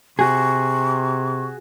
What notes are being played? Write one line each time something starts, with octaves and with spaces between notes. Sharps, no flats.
C3 F#4 G#4 C#6